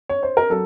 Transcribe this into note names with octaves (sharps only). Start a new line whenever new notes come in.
C#5
C5
A#4
F#3 A4